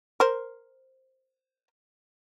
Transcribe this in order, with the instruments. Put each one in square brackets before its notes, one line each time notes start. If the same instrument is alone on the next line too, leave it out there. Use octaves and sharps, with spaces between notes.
[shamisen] A#4 C5